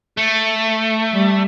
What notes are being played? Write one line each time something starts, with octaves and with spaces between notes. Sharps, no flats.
A3
G3